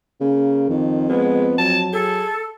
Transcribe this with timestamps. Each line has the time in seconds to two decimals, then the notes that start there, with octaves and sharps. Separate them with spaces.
0.21 C#3 A#3
0.69 F2 D#3
1.09 G#3 B3
1.58 F#3 A5
1.93 G#4 A4